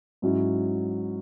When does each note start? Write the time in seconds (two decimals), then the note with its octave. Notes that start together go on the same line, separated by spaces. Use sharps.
0.22 G#2 F#3 C#4 E4